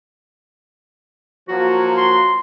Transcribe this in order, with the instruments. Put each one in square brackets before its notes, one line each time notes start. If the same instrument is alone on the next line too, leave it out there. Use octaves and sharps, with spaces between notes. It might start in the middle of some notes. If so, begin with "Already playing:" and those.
[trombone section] F3 F#3 A#3 [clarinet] F#4
[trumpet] C6